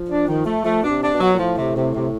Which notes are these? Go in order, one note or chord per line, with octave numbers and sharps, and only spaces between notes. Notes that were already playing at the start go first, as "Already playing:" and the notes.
Already playing: F3
D4
D#3
A3
F3 A3
B2 D4
C3
D4
B2
F#3
A#2
A2 F3
C3
C3
C3